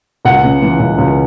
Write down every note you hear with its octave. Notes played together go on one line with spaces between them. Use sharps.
C#2 F#5
C#3
E3
C#2
C#2